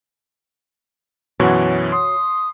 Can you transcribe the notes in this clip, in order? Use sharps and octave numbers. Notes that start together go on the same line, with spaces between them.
F#2 B2 E3 F#4 C#5
C6 D#6